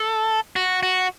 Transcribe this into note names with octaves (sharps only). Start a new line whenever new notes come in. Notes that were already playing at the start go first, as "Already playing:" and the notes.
Already playing: A4
F#4
F#4